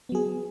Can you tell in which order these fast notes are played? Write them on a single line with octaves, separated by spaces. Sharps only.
B3 F#3 G#4